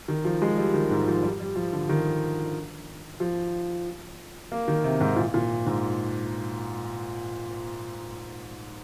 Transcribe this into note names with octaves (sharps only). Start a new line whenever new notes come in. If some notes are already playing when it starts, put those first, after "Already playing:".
D#3
F3
G#3
G3
D#3
G#2
F3
G3
G3
F3
D3
D#3
F3
A#3
D#3
C3
G#2
A#2
A#2
G#2